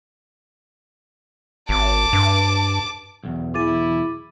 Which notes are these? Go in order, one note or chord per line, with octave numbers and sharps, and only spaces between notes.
G#1 A5 D6
G2
B1 E2
E3 E4 G#4 D6 A6 D#7